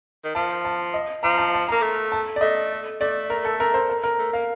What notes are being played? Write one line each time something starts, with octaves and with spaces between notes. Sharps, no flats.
D#3
F3 A5
A5
D#5
F3 A#5
A5
A5
A#3 A#5
A3
A5
D5
A3 D#5
A3 D5
A#4
A4
A#4
C5
A#4
A#4
A3
A#3 F5